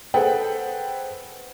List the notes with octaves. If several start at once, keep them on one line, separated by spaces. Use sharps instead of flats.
G#4 A4 B4 C5 F#5 G5